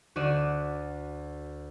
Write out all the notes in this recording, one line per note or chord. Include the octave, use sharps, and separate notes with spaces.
D2 F#4 D5 D#7 E7